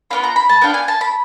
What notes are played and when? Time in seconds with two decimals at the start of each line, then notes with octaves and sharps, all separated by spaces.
0.11 B3 D4 F4 B5
0.24 A#5
0.36 B5
0.49 A5
0.62 B3 D4 F4 G5
0.74 G#5
0.88 A5
1.01 B5